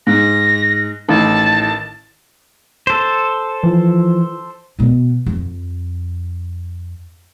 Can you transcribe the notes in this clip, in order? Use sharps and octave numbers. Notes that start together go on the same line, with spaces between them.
G#2 A#6
A1 A2 D#3 A5
A4 C5
E3 F3
B2 B3
F2